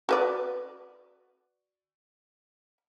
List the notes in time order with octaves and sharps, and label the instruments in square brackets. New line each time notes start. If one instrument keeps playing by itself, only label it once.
[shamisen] F#4 B4 D5